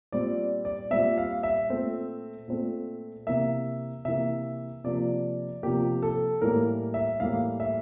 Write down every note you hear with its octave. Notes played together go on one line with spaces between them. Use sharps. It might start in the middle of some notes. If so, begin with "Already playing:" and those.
A#2 G3 C4 D5
D5
A#2 G3 C4 E5
F5
E5
A#2 A3 C4
A#2 A3 C4
C3 E3 A#3 E5
C3 E3 A#3 E5
C3 F3 A#3 D5
C3 F3 A#3 G4
A4
A2 E3 G3 A#3 A#4
E5
A2 E3 G3 A#3 F5
E5